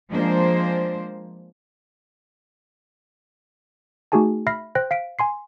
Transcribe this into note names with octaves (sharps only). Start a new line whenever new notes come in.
F3 G#3 A#3 D4 C5
A3 D#4 F#4 G#4 G#5 A5
E5 B5 F6 A#6 C7
C5 G5 F#6 A#6
F5 B6 D7
G#5 C6 C7